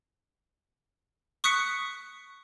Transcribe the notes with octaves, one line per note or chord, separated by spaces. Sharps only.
C#6 D#6 F#6 B6 C#7